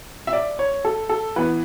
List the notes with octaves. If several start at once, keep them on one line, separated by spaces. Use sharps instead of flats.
E5
D5
C#5
A4
A4
E3 B3 B4